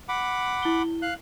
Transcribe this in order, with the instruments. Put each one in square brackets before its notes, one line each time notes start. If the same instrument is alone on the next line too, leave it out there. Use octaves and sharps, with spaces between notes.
[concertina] F#5 B5 D6
[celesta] E4 G7
[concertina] F5 F#6